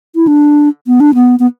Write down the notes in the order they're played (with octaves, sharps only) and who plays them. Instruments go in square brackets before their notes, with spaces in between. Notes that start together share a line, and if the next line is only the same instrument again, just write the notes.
[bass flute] E4
D4
B3
D4
B3
B3